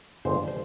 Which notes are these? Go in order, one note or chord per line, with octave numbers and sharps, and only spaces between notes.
G1 G2 F3 G#3 C5
C5